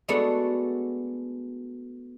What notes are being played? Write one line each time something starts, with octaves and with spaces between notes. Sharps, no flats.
G#3 A3 B3 D4 F#4 A4